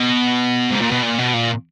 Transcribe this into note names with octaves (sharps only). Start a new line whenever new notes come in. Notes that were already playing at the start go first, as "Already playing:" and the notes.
Already playing: B2
G#2
A#2
B2
A#2
B2
A#2